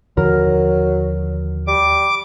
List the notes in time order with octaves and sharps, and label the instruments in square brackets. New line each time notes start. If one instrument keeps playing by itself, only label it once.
[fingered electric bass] D#2 D3 F3 [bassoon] F#3 [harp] A#4
[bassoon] G3 [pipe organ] D6